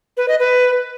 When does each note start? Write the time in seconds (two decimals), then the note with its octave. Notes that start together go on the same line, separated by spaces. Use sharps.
0.17 B4
0.28 D#5
0.40 B4